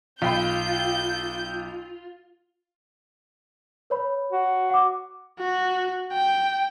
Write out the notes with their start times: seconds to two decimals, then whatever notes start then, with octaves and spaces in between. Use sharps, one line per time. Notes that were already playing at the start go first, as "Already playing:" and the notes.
0.22 B1 F4 G5 B5 G6
3.90 B4 C#5 B5
4.32 F#4
4.70 F#5 D6
5.39 F#4
6.12 G5